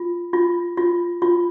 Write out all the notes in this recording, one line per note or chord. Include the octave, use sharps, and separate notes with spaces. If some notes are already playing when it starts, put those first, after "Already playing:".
Already playing: F4
F4
F4
F4